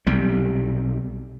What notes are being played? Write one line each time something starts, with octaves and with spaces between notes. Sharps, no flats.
B1 C3 G3